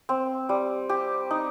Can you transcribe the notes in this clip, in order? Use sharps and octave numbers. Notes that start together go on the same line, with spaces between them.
C4
G3
G4
D#4